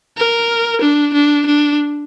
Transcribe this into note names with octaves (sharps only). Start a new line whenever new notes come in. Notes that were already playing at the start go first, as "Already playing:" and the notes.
A#4
D4
D4
D4